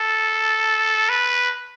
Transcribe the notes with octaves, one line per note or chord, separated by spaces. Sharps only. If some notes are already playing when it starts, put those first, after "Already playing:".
Already playing: A4
B4